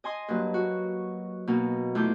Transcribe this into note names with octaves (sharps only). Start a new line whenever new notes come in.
D#5 G#5 C6 D#6
G2 F#3 A#3 B4
F#4
B2 A#3 D#4
E2 A3 F4 D6 G6